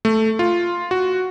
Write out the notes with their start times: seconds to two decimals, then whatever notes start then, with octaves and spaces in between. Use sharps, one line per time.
0.05 A3
0.39 F4
0.91 F#4